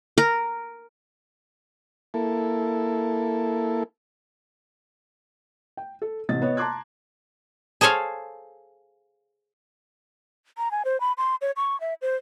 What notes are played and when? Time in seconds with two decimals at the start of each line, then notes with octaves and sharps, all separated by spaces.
0.18 A#4
2.14 A#3 E4 A4
5.77 G5
6.02 A4
6.29 A1 C3 D#5 A6
6.42 B3 C#5 D#5
6.57 A5 A#5 C6 D6 F#6 G#6
7.81 G#4 A4 C5 C#5 F5
10.58 A#5
10.71 G#5
10.85 C5
11.01 B5
11.18 C6
11.41 C#5
11.57 C#6
11.81 E5
12.02 C5